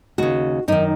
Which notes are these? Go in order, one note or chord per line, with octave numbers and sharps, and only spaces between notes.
D#2 C#3 F#4
F#2 D#3 D#4